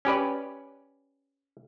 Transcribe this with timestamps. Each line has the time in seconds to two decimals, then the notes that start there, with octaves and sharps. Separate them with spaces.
0.05 C#4 G4 B4 D5